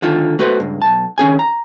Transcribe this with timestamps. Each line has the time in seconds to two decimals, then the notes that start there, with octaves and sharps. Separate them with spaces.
0.02 D3 D#3 F4 A4
0.39 A3 F#4 B4 C5
0.60 C#2 G2
0.82 B1 A5
1.18 D#3 C#4 G#4 G#5
1.39 A#5